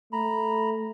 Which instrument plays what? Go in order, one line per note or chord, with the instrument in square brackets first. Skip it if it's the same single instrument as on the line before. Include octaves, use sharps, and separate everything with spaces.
[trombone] A3 [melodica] A#5 B5